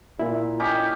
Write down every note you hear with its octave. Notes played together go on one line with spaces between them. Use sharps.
A#2 E4
C#4 D#4 G4